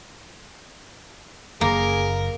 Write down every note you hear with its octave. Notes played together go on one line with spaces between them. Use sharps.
F#1 F#2 A#3 G#4 A#4